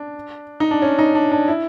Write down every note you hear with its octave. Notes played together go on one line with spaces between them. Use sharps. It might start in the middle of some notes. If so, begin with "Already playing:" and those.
Already playing: D4
D#4
D4
C#4
D#4
D4
D4
E4